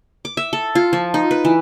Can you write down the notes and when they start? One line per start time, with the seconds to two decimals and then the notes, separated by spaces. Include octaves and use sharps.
0.25 D6
0.37 E5
0.53 A4
0.75 F4
0.93 F3
1.14 D#4
1.31 B4
1.45 E3